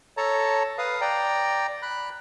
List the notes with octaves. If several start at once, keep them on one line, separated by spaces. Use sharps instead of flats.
A4 C#5 A5 A#5
B4 F5 D#6
D5 G5 A#5
B5 F#6